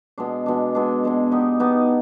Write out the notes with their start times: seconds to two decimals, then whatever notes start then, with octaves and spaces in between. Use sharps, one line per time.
0.18 B2 G#3 D4
0.46 B2 G#3 D4
0.75 B2 G#3 D4
1.04 B2 G#3 D4
1.31 B3 D#4 G4
1.60 B3 D#4 G4